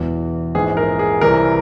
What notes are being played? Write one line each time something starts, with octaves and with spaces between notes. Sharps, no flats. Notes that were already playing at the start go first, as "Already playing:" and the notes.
Already playing: E1 E2 E3
A#1 G#2 E3 G#4
A#4
G#4
C2 C3 E3 A#4